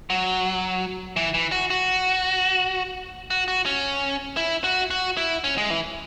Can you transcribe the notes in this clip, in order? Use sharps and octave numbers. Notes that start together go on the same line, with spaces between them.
F#3
E3
E3
F#4
F#4
F#4
F#4
C#4
E4
F#4
F#4
E4
C#4
G#3
E3